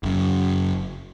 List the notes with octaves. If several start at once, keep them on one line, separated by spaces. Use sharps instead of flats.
F#1 F#2